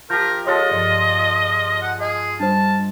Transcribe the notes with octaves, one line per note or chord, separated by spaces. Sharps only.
F3 G4 A#4 G6
G#3 F4 G4 A4 C#5 D#5 A5
G2 F3 D5
F#5
G#4 D#5
G3 D4 C5 A5